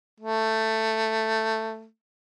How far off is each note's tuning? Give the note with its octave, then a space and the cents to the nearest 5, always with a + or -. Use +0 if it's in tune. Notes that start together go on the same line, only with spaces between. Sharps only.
A3 +10